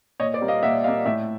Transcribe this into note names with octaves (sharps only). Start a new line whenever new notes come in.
A#2 C#5 D#5
C5 D5
G3 A#3
D#5 F5
A#2 E5 F#5
G3 A#3 D#5 F5
A2 D5 E5